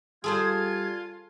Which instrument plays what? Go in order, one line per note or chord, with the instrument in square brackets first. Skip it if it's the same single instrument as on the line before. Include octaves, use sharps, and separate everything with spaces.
[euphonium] G3 [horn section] F4 [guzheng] G#4 A4 C5 [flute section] G#6